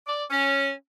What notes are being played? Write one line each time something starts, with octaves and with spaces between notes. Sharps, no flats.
D5
C#4